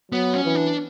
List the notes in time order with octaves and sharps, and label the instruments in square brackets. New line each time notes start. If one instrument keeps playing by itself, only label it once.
[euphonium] F#3 [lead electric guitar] B3
[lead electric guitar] C#4
[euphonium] E3
[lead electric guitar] D4